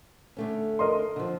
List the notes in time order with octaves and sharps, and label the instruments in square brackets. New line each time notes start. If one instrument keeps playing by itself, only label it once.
[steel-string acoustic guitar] D3 A3 C#4
[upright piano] A#4 D#5 C6
[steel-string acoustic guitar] D3 F3